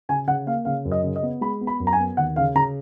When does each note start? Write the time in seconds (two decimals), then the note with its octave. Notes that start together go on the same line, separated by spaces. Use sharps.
0.09 C#3 G#5
0.27 C#3 F#5
0.46 A#3 F5
0.65 C#3 F5
0.85 F#2
0.92 D#5
1.03 C#3
1.16 D#5
1.23 B3
1.41 G#3 B5
1.61 B3
1.67 B5
1.80 F#2
1.87 A#5
1.93 G#5
1.99 B3
2.17 D#2 F#5
2.36 C#3 F5
2.55 C#3 A#5